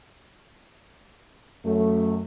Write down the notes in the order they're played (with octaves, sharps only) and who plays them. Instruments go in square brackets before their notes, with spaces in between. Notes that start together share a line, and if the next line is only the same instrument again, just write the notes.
[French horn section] F#2 A3